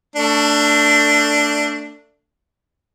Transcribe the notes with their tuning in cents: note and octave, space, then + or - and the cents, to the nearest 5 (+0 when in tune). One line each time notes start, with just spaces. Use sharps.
A3 +25 D4 -5